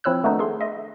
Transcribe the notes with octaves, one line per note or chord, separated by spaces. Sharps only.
F3 C4 E4 C#5 E6 F#6
D#3 A3 B3 D4 D#4
G#4 A4 C6
D#5 E5